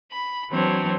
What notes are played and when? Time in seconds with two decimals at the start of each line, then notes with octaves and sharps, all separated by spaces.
0.10 B5
0.51 E3 F#3 C4 D4 C#5